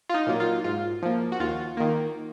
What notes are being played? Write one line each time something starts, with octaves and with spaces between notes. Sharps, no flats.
F4
D#4
A#2 F#3 A#3
F4
G#2 F4
F3 A#3
F#4
D#2 F4
D#3 A#3